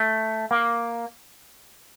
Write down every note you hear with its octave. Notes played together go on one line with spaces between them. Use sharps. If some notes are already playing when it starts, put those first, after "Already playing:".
Already playing: A3
A#3